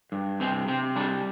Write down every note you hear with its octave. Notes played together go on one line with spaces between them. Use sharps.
G2
C3 C4
C3 C4
G3 D4